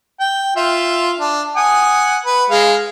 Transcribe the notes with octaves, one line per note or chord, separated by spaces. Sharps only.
G5
F4 E5
D4
F#5 G#5 D#6
B4
G#3 F5